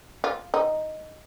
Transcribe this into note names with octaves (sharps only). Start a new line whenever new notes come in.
F4
D#4